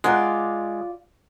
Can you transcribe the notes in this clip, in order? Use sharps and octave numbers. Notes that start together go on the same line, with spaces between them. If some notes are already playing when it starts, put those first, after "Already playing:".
G#3 F4 D5 F#5 A#5 F#6